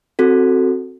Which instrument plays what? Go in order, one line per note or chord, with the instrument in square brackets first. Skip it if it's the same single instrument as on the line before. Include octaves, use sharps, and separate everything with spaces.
[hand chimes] C4 F#4 A4